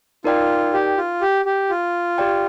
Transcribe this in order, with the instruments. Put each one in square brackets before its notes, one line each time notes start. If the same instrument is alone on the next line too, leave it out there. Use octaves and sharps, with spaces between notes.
[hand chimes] D#4 A#4 D5 G5 [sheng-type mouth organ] F4
[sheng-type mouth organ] G4
F4
G4
G4
F4
[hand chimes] G4 D5 G5